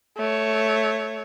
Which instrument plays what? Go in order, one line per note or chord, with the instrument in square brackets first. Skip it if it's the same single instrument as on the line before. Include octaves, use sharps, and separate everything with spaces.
[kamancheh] A3 C#5